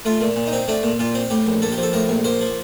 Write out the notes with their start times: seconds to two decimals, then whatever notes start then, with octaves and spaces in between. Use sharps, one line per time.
0.05 A3 F4
0.21 A#2
0.36 A#2
0.47 D#4
0.52 C4
0.68 A3 D4
0.83 A#2
1.00 A#2 F4
1.15 C4
1.30 A2 G4
1.47 A#1
1.62 A#3 A4
1.72 G4
1.78 F3
1.83 A4
1.93 A2 A#4
2.09 A#1
2.24 A#3 C5
2.41 F3